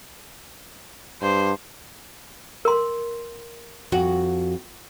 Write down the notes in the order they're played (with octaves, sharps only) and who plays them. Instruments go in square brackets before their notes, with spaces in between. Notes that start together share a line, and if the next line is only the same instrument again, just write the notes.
[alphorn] G2 [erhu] C5
[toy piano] A#4 C6
[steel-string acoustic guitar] F2 [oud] F#4